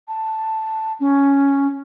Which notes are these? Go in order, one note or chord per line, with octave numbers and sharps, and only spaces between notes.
A5
C#4